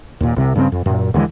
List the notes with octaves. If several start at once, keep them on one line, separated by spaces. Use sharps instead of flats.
D#2 A#2
C2 C3
G2 C#3 G3 C4
F2
F#2 A#2
D#2 D3 E3 G#3